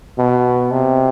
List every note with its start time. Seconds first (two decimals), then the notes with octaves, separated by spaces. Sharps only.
0.18 B2
0.71 C3